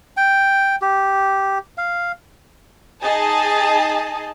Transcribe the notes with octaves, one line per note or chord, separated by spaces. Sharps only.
G5
G4
F5
D#4 G#4 D#5 A5